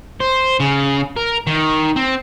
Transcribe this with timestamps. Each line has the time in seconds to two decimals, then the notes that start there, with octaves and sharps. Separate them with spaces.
0.20 C5
0.60 C#3
1.16 A#4
1.47 D#3
1.96 C4